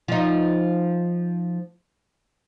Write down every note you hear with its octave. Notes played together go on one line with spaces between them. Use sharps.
F3 D#4